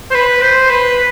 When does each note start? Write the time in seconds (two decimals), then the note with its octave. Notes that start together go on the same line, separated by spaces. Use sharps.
0.10 C5
0.14 B4
0.42 C5
0.69 B4